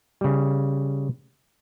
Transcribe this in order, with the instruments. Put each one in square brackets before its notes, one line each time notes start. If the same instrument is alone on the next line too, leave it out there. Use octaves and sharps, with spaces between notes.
[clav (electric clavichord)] C#3 G3